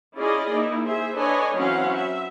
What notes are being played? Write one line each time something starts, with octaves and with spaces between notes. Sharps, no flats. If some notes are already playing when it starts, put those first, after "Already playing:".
C#4 E4 F4 G#4 D5 D#5
A#3 D#4 E4
G#4 C5 E5
D4 A4 B4 C#5 D#5 G#5
E3 F#3 C4 C#4 F5 F#5
E5